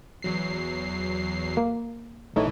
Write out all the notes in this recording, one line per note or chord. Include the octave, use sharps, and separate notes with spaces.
E2 F#3 C7
A#3
A#1 E3 A3 D#4 C#5